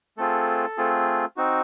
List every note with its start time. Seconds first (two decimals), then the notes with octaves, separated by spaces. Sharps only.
0.18 A3 C4 F4 G#4 A4
0.77 A3 C4 F4 G#4
1.37 C4 D#4 F#4